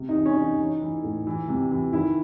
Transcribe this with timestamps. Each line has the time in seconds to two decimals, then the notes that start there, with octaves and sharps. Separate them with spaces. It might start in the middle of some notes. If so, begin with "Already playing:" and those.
Already playing: C3
0.09 D#4
0.14 E3
0.26 C#4
0.36 E3
0.42 D#4
0.59 E3
0.81 E3
1.03 A2
1.27 E3
1.48 C3
1.71 E3
1.93 D#3 E4